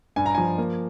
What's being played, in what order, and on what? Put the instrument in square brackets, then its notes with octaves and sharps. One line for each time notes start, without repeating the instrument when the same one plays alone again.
[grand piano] G2 G#5
A#5
F3 G#5
A#3